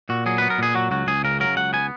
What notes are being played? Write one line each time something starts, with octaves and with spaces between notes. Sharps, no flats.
A#2 F#4
F#3 G#4
B3 B4
A#4
A#2 G#4
F#3 F#4
C#2 F#4
C#2 G#4
C#3 A#4
F#3 A#4
C#2 F#5
B3 G#5